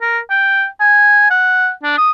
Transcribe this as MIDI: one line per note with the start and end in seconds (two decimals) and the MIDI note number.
0.01 0.19 70
0.30 0.66 79
0.80 1.29 80
1.30 1.71 78
1.83 1.95 62
1.98 2.11 87